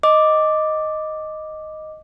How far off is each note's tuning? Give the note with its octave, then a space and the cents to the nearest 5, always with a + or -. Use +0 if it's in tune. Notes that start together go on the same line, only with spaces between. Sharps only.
D#5 +0 D6 +0